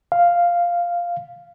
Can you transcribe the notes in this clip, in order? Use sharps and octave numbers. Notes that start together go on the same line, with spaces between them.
F5